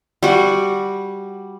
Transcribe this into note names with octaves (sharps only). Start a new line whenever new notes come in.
G3 F#4